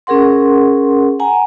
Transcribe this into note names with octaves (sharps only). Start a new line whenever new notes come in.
C#4 G#4 A#4 F#5 C6
F#5 G#5 A#5